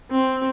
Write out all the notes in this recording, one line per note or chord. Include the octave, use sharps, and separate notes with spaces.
C4